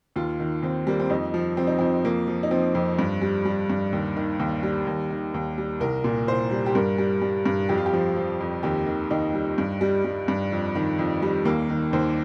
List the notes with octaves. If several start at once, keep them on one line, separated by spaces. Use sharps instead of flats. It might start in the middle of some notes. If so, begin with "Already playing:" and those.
D#2 F4
D#3
D#2 C4
G3 A#3
C4
F2 D#4
F3
F3 C4
D#4
F2 C4
F2 A#3
F3
D#4
F3 C4
F2
G2
G3
G3
G2
D#2
D#3
D#2
G3
D#2
D#3
D#2
G3
C2 A#4
A#2
C2 C5
G3
G4
G2 A#4
G3
G3
G2
F2 G4
F4
G4
F3
F3
F2
D#2 G4
D#3
D#2 D#4
G3
G2
G3
G3
G2
F2
D#3
F2
G3
D#2 A#3
D#3
D#2 C5